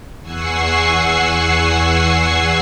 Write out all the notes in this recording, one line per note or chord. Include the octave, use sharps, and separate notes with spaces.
E2 F#5 G#5 C#6 E6 C7